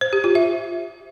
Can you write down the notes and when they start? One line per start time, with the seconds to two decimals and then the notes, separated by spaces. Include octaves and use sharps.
0.01 C5
0.13 G4
0.24 F4
0.35 E5